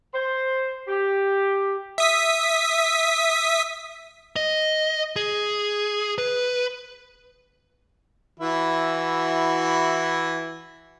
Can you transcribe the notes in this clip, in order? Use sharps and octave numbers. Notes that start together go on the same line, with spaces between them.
C5
G4
E5 D#6 B6
D#5
G#4
B4
E3 E4 F#4